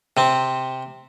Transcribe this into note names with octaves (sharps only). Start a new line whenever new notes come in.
C3 C4